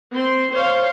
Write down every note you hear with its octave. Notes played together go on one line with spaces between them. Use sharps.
C4 C6
C5 C#5 F5 C6